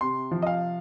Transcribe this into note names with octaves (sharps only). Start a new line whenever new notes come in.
C3 C6
F3
D#5
F5